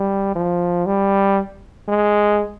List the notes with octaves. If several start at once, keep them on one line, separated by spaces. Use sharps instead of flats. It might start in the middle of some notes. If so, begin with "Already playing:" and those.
Already playing: G3
F3
G3
G#3